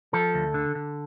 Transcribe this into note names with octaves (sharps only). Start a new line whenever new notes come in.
F3 A4
D2
D3
D3